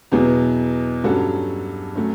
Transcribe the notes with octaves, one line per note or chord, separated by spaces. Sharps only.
E2 B2 F#3 B3 E4
G2 F#3 C#4 F#4 A4
F#3 A3 C#4